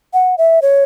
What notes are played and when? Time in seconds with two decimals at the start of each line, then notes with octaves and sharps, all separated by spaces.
0.14 F#5
0.38 E5
0.62 C#5